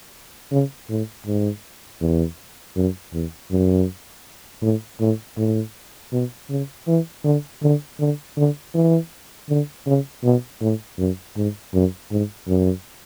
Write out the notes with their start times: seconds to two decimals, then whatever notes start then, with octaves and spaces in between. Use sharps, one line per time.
0.51 C#3
0.90 A2
1.27 G#2
2.01 E2
2.76 F#2
3.13 E2
3.51 F#2
4.62 A2
5.00 A2
5.38 A2
6.13 B2
6.50 C#3
6.88 E3
7.25 D3
7.63 D3
8.00 D3
8.37 D3
8.74 E3
9.49 D3
9.87 C#3
10.23 B2
10.61 A2
10.98 F#2
11.36 G#2
11.74 F#2
12.11 G#2
12.48 F#2